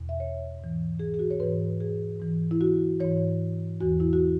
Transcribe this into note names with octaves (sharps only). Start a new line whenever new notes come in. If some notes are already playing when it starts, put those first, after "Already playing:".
Already playing: E2 B2
E5
C#5
G#2 E3
G#4
G#4
F#4
C#5
G#2 E3 B4
G#4
G#2 E3
E4
F#4
G#2 E3 C#5
E2 E3 F#4
E4
F#4